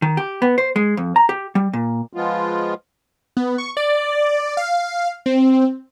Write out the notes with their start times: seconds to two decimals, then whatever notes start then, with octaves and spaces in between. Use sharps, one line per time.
0.02 D#3
0.17 G4
0.42 B3
0.58 C5
0.76 G#3
0.97 F2
1.16 A#5
1.29 G4
1.55 G3
1.73 A#2
2.13 F3 G#3 B3 F4
3.37 B3
3.58 C#6
3.77 D5
4.57 F5
5.26 C4